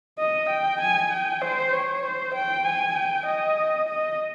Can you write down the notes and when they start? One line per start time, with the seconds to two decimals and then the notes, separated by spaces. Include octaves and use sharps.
0.19 D#5
0.49 G5
0.81 G#5
1.11 G5
1.41 C5
1.72 C#5
2.03 C5
2.34 G5
2.65 G#5
2.95 G5
3.26 D#5
3.88 D#5